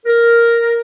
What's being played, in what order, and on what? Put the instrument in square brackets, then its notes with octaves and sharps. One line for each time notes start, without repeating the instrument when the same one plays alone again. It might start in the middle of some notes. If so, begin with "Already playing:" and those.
[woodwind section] A#4